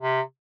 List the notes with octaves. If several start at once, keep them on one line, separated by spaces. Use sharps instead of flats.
C3